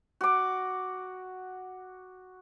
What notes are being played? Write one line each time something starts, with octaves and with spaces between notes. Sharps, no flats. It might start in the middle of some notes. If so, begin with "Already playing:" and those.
F#4 D6